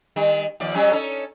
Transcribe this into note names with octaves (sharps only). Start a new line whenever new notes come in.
D#3 G3
D#2 F3 D5
F#3 G3 C#4
C#4 D#4 A4